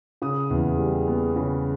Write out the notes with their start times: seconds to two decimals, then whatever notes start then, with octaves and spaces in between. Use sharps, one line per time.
0.22 C#3 D#6
0.50 E2
0.79 G3
1.08 B3
1.36 C#3